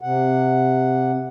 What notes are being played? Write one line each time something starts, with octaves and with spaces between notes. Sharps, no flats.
C3 F#5